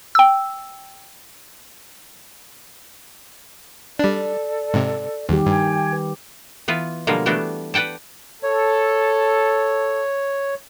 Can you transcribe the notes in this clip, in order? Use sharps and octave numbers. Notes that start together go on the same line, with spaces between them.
G5 E6
G3 D4 A4 D5
G#2 C3
E2 D#3 G3 G4
G2 G5 G#5 G#6
B4
E3 B3 F4 B4
B2 D3 F3 G3 G#3 A#3
E3 G3 A3 B3 D4 F#4
B4 D5 F#5 G5 A5
A4 C#5